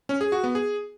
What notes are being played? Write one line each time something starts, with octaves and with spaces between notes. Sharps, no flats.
C#4
G#4
F#4
B3
G#4